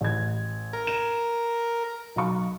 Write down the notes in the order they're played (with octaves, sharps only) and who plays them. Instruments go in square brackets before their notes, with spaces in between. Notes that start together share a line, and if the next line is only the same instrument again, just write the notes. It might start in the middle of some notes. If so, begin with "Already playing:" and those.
[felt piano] A1 G#6
[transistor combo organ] A#4
[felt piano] E7
B1 F5 C#6